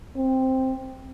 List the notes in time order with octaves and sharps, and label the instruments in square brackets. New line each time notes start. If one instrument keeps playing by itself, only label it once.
[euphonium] C4